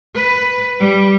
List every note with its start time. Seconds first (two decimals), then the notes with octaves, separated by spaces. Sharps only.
0.15 B4
0.79 G3